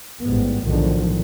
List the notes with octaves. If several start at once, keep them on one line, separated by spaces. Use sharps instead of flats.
A1 G#2 G3 B3
B1 E2 A2 D3 D#3 F3